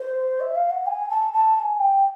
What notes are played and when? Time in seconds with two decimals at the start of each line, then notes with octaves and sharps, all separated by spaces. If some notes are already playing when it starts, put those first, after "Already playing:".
Already playing: C5
0.40 E5
0.55 F5
0.70 F#5
0.86 G#5
1.09 A5
1.33 A5
1.56 A5
1.59 G#5
1.79 G5